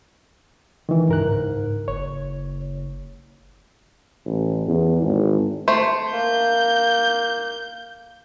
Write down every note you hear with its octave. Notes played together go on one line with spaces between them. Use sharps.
D#3 E3
C#2 G2 A#4 F#6
G#2
F#1 C#5
A1
E2
G#1
A3 C5
A#3 G6